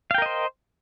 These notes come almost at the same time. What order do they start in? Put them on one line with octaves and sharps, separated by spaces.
F5 G5 A#4 D#5 C5